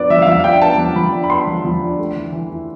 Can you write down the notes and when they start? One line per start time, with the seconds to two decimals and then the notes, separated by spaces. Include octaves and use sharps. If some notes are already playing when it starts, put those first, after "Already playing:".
Already playing: F3 B3 D4 D5
0.10 F3 E5
0.22 F5
0.27 F3 E5
0.39 F5
0.44 D4 G5
0.62 B3 A5
0.78 F3
0.96 F3 B5
1.13 D4
1.24 B5
1.30 B3 C6
1.47 F3
1.65 F3
1.81 D4
1.99 A3
2.16 E3
2.32 E3
2.50 E4